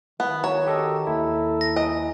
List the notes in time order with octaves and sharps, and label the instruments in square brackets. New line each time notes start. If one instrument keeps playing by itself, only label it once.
[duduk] D#3 [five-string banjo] B3
[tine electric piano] F#4 [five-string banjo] C#5 [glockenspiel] A#5
[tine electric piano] G4 A4 D#5
[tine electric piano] D#2 E4 [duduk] A4
[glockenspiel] A#6
[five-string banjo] D#5 [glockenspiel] G#5